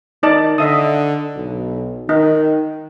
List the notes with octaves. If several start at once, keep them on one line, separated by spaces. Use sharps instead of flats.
D#3 D#4 D5 A5
D3 D#5 E5 D#6
B1
D#3 D#4